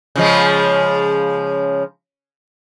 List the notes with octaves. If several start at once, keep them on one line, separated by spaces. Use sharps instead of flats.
C#3 F3 G#3